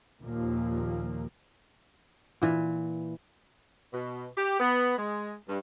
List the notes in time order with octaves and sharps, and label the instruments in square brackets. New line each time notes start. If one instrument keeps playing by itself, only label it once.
[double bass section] D#2 A#2 F3 A#3
[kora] A#2 E3
[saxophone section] B2
G4
B3
G#3
G2